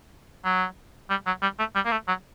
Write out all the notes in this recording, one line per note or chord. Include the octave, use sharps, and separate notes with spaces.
F#3
G3
F#3
G3
A3
G3
A#3
A3
F#3